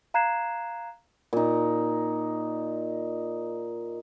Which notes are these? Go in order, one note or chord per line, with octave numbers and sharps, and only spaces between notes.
F5 A#5 F#6 G#6 C7 E7
A#2 D#4